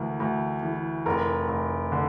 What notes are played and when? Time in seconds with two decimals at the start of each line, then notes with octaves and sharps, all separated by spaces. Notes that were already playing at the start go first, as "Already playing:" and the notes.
Already playing: D2 E3 A#4
0.20 D2
0.63 E3
1.06 F1 A#4
1.49 F1
1.92 D3